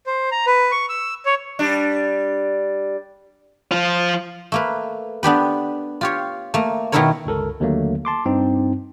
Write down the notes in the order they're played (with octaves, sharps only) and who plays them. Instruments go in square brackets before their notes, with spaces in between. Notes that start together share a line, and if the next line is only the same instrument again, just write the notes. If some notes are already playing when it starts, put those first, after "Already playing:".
[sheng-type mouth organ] C5
A#5
B4
C#6
E6
C#5
[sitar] G3 D4
[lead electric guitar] F3 F4
[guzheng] A3 A#3 B4
B3 D4 G4 B4
F4 G4 C#5
A3 A#3
B2 D#3 A3 E4 A#4 C#5
[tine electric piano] G1 C#2 A4 A#4
D#2 D3 F#3 A3 A#3
A5 C6 D6
G2 C4 D#4